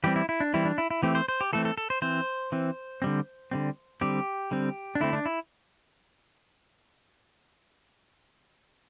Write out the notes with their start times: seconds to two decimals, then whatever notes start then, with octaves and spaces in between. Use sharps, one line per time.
0.04 E3 G3 C4 G4
0.16 E4
0.29 E4
0.40 D4
0.54 E3 G3 C4 E4
0.65 D4
0.78 E4
0.90 E4
1.03 E3 A3 C4 G4
1.15 C5
1.28 C5
1.41 G4
1.53 E3 A3 C4 A4
1.65 A4
1.77 A4
1.90 C5
2.02 E3 C4 C5
2.52 E3 C4
3.02 D3 G3 C4
3.51 D3 G3 C4
4.01 D3 G3 C4 G4
4.51 D3 G3 C4
4.95 D4
5.00 D3 A3 C4 E4
5.13 D4
5.26 E4